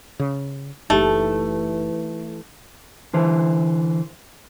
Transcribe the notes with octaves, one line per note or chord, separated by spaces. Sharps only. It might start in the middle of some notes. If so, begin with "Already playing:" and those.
C#3
F#1 E3 A3 D#4 G4
D3 E3 C5